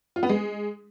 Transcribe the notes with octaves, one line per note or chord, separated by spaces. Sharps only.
F4
B3
G#3